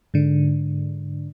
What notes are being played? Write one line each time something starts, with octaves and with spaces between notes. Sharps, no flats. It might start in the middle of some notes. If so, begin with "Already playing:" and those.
G#2 D3